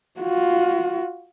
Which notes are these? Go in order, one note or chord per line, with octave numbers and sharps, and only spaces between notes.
F4 F#4